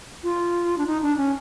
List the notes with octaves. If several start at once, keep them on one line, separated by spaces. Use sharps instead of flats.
F4
D4
D#4
D4
C#4